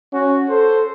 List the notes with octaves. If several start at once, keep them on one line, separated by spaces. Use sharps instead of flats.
C#4 F#4
A4 C5